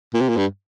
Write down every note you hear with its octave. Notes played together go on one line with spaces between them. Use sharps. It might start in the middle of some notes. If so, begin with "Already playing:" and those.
A#2
C3
A#2
G2